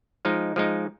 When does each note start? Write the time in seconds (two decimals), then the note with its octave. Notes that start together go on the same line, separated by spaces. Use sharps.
0.25 F3 G#3 D#4
0.56 F3 G#3 D#4